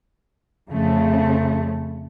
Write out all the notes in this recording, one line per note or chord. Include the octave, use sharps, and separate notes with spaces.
F2 C#3 A3